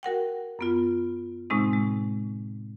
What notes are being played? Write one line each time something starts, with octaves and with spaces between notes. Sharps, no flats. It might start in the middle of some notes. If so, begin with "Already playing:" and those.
F#4 A#4 F#5 G5
F#2 B3 F4
A2 C3 G#3 C4 D#4
G#3